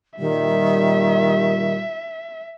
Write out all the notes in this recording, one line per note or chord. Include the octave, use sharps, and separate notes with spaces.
A#2 D#3 G3 E5